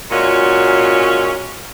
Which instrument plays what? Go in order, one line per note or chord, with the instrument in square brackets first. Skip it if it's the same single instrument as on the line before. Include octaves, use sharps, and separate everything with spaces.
[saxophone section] A#2 G#3 C#4 F4 F#4